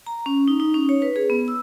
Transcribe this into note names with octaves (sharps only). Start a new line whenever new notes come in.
A#5
C#4
D#4
D#4
C#4
C#5
B4
G#4
B3
E6